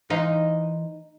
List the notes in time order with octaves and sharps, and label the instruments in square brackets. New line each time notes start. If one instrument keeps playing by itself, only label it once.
[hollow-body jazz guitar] E3 C5 F5 [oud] D#4